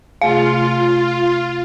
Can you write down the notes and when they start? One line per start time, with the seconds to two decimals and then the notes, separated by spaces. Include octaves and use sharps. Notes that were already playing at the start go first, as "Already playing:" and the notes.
0.21 C3 A3 F4 G#4 F5